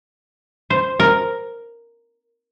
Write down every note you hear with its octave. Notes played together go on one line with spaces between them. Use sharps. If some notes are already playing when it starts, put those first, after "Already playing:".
C5
A#4